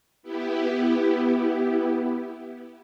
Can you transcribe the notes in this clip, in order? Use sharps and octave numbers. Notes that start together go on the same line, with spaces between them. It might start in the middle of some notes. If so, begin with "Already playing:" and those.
B3 E4 G4